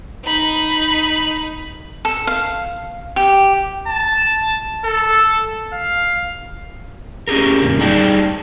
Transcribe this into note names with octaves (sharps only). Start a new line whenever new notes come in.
D#4 B5
A4
F5
G4
A5
A4
F5
C#4 G4 G#4 A#4
F#2 A#2 D3
G3 D#4 G#4 D5 G5 A5